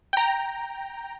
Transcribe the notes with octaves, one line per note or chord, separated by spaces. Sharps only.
G5 A#5